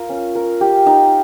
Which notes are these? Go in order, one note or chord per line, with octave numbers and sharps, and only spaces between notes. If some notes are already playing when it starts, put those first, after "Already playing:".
Already playing: F4 A#4
C#4
A#4
G4
D#4